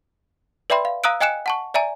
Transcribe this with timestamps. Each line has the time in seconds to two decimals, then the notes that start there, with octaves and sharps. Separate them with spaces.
0.70 B4 D5 E5 G5 B5 C6
0.85 F5
1.04 F5 A#5 D#6 E6 F#6 D7
1.21 D#5 G5 G#5 F#6 C#7 E7
1.46 F#5 A5 C#6
1.74 D5 E5 G#5 A#5